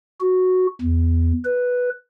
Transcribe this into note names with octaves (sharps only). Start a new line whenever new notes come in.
F#4
E2
B4